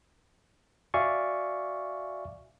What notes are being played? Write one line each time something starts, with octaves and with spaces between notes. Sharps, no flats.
F#4 D5 E5 F5 G#5 C#6